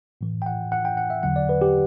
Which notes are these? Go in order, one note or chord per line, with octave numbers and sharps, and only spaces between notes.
A2 E3
G5
F#5
F#5
G5
F#5
E5
E2 D3 F#3 F#5
D5
B4
G4